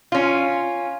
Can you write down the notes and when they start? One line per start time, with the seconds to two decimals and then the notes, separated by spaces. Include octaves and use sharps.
0.12 C#4 F4